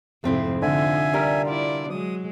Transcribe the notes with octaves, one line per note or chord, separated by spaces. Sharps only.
F2 G#2 C3 A3 C4 E4
D3 D#4 F4 E5 G#5
G3 A#4
E4 F4 D5
F#3 G#3 D#6